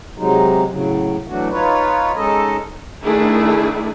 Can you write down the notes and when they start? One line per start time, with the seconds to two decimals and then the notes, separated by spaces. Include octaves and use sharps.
0.18 C3 F#3 G#3 D#4
0.68 A2 C#3 F#3
1.28 E3 F#3 A3 D4 F#4
1.50 D#4 F4 B4 C#5
2.16 G#3 C#4 D#4 A4 D#5
3.03 D#3 A3 D4 E4 G#4